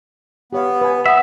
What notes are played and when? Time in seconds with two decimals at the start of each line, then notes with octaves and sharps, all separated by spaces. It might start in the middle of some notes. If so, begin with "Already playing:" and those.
0.53 B3 G4 C#5 F5
0.81 B4 G#5
1.06 E5 F#5 D#6